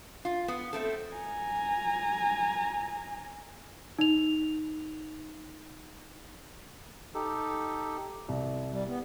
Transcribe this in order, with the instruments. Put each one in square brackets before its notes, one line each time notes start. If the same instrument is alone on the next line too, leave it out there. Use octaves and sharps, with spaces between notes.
[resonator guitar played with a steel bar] F4
B3
A3 C4 A4
[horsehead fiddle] G#5 A#5
[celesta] D#4 F7
[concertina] D#4 G4 A4
[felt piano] C2
[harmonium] G3
B3